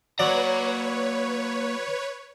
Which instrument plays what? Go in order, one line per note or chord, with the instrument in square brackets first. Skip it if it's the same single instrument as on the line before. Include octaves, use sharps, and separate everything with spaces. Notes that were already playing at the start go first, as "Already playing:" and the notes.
[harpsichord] F#3 D5 [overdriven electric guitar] A#3 A#5 [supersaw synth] B4 C#5